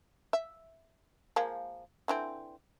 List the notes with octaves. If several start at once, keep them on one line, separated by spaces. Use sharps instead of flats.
E5
F3 G#3 A#3
D3 E3 C4